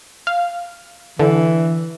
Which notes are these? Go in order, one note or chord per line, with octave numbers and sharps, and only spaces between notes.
F5
D3 E3